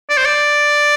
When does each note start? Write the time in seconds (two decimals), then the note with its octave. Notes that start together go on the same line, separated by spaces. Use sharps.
0.10 D5
0.17 C5
0.25 D5